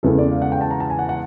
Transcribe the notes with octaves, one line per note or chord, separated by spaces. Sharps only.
E2 C#3 E3 G#3 A4
D5
F5
F#5
G5
A5
A#5
A5
G#5
F#5
F#5